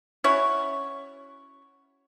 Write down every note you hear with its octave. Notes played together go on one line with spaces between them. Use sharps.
C#4 E4 F#4 C#5